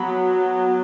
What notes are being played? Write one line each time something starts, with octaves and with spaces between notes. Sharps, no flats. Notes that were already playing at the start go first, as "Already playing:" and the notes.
Already playing: F#3 B3 B5